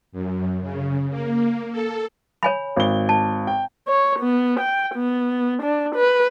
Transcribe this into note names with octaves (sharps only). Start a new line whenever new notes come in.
F#2
C#3
A#3
A4
C#5 G#5 B5
G#1 G7
A5
G5
C#5
B3
G5
B3
D4
B4